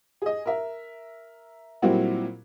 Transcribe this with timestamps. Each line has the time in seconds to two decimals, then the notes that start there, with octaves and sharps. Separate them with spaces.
0.22 G#4 D#5
0.46 A#4 E5
1.82 A#2 F#3 G3 C4 E4 F#4